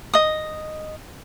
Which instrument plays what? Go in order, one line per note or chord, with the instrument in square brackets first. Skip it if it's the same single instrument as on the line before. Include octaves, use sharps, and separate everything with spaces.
[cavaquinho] D#5 D#6